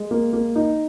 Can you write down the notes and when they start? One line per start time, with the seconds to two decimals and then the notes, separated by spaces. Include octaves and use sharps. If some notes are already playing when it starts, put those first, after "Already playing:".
Already playing: G#3
0.11 A#3
0.33 A#3
0.55 D#4